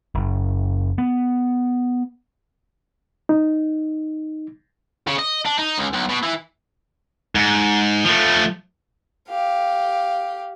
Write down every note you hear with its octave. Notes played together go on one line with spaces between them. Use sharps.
F#1
B3
D#4
C#3
D#5
D4
D#4
C#2
B1
B2
E3
G#2
F3 A3
G4 F5